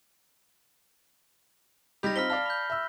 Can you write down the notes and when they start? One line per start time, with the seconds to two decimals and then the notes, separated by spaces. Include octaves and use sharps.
2.03 G3 D#4 G4 B5 A#6
2.16 C4 D#4 F4 F6 B6 G7
2.30 D5 F5 A5 F6
2.46 B5 G6
2.70 E5 E6